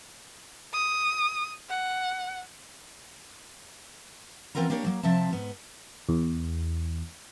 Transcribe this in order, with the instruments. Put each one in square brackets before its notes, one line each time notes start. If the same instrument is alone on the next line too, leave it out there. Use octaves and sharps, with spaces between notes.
[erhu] D#6
F#5
[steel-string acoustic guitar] E3 B3 C4 F4 A#4 A#5
A#3 D4 G4 A#4 C#5
F#3 A#3
C3 F3 C4 E5 A5
G#2 B3
[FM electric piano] E2